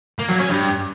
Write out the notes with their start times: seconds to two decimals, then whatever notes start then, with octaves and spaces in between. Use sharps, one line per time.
0.19 A#3
0.29 F#3
0.39 C#4
0.49 G2